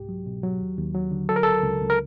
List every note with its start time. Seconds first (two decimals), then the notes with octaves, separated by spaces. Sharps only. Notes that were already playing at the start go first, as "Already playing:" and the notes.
Already playing: C2 G#2 G4
0.09 F#3
0.26 B2
0.43 F#3
0.60 D#2
0.78 D#2
0.94 F#3
1.11 D3
1.29 F#3 A4
1.36 A#4
1.43 C#2 A4
1.64 C#2
1.81 C#2
1.90 A#4